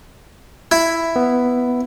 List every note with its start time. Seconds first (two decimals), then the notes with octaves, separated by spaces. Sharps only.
0.72 E4
1.16 B3